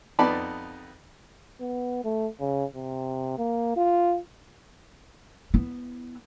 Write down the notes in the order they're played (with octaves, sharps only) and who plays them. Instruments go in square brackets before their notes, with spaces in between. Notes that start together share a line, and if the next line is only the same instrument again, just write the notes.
[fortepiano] F2 B3 D#4 D5 A5 B5
[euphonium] B3
A3
C#3
C3
A#3
F4
[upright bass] B3 E4